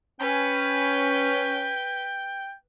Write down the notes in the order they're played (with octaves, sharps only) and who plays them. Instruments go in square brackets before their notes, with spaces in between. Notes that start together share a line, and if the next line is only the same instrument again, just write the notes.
[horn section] C#4 [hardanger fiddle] B4 [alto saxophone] G5